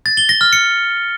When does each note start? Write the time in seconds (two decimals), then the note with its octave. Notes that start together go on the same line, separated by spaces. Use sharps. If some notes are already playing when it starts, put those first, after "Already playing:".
0.06 A6
0.17 G7
0.29 A#6
0.41 F6
0.53 C#7